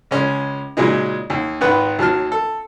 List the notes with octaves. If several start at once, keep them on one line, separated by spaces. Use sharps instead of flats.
C#2 G#3 C#4
A#2 C#3 F#3 G#3 D#4
D#2
G#1 D#3 B4 F#5
D#2 F#3 A5 F6
A4